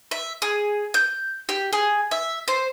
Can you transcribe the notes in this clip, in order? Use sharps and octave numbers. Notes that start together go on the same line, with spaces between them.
E5
G#4
G6
G4
G#4
E5
C5